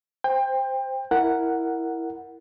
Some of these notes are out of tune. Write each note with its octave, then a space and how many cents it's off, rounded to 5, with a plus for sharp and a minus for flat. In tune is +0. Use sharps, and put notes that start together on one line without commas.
C5 +0 G5 +25
E4 +0 A#4 -5 F#5 +0